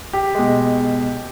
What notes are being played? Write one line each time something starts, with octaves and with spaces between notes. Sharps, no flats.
G4
B2 G#3